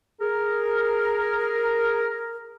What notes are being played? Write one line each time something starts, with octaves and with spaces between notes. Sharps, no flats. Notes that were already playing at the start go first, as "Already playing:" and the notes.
G#4 A#4